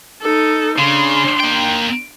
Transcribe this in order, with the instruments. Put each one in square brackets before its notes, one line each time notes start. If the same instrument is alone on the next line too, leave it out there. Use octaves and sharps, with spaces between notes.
[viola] D#4 A4
[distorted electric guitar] C#3 [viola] D4 C6
[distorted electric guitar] A#3 G5